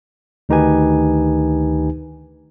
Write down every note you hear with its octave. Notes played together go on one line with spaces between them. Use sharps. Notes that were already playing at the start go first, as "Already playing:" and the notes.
D2 D#3 D#4 G4 B4 G#5